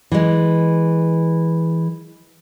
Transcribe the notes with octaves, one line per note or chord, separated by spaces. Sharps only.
E3 G#3